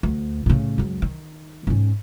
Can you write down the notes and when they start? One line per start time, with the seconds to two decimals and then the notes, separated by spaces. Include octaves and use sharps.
0.03 D2
0.46 A2 C#3
0.78 C#2 F#2
1.02 D#3
1.67 G#2 C#4